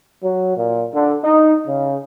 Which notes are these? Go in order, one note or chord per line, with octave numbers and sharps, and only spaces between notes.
F#3
A#2
D3
D#4
C#3